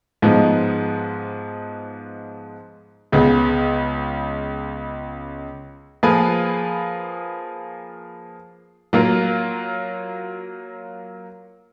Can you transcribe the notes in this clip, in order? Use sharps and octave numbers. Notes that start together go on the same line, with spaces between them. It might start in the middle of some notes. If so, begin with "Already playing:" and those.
G#2 F3 G#3 B3 D#4
C#2 C#3 G#3 B3
F3 A#3 F4 G#4 B4
F#3 A#3 F4 A#4